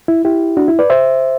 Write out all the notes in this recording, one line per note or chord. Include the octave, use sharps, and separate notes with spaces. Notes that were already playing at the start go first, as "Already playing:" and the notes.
E4
E4 G4
D4 F#4
E4
B4 D5
C5 E5